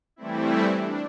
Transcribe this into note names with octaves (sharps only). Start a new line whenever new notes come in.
E3 G3 A3 C4 E4
D4